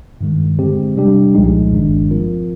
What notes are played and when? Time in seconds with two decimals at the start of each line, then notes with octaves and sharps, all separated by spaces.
0.21 G2 D#3 G#3
0.59 D3 G#3 C4 G4
0.97 C3 G3 D4 G4
1.34 C2 A#2 F3 G#3 D#4
1.73 G1 G2 D#3 G#3 D4
2.11 F3 C4 F4 A#4